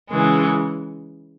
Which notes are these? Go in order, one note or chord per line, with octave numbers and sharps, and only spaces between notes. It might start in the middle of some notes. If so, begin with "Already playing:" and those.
C#3 E3 G#3